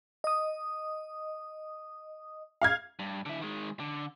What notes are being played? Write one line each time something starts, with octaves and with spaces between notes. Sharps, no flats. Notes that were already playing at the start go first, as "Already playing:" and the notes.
D#5 D#6
F5 F6 G#6
G2
D3 E4
D#3 G#3
D3